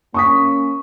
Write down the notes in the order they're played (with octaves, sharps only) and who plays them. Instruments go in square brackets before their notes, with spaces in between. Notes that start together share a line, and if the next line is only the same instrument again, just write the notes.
[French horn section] A#3 C#4 [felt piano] C#6 D#6 B6